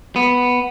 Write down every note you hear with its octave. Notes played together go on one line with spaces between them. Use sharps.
B3